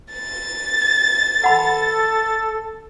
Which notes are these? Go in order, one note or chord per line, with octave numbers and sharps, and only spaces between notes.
A6
A4 F#5 B5